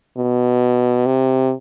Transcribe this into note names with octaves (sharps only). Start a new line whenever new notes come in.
B2
C3